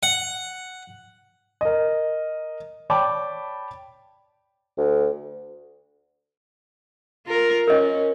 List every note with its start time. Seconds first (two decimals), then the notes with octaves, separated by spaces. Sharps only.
0.03 F#5
1.61 A#4 D#5
2.90 C#5 D5 G5 A5 B5 D6
4.78 D2
7.27 F4 A#4
7.67 C#4 A#4 D#5